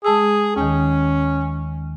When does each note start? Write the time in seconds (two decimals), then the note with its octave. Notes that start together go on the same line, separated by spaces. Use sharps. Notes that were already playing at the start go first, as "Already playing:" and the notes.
0.05 G#3 G#4 A5 E6
0.56 D#2 D#3 C#4